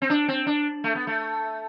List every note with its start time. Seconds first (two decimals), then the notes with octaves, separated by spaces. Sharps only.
0.02 C4
0.10 D4
0.28 C4
0.47 D4
0.84 A3
0.95 B3
1.07 A3